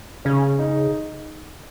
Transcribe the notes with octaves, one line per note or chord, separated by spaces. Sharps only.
C#3 C#4
D#4